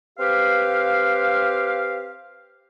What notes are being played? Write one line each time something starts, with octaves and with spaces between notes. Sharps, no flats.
C4 G4 B4 F5